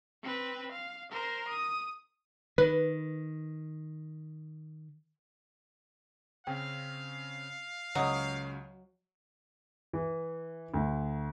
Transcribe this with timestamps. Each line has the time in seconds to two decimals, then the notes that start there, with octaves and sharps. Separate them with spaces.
0.23 C4 B4
0.72 F5
1.11 A#4 C5
1.48 D#6
2.58 D#3 B4
6.47 C#3 C4 C#4 F5 G5
7.95 C#2 C#3 F#3 C#5 D#5 D#6
9.93 E3
10.74 D2